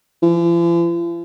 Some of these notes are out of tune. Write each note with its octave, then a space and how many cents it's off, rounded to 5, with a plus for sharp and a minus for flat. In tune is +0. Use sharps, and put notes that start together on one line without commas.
F3 -45